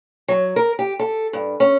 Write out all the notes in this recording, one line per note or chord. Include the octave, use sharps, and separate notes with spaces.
F#3
A#4
G4
A4
G2
C#4